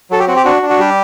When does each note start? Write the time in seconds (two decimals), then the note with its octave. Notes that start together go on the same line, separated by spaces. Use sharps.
0.11 F#3 A4
0.19 G4
0.28 C4 F#4
0.36 G4
0.45 D4 F#4
0.62 D4
0.70 F#4
0.80 G3 G4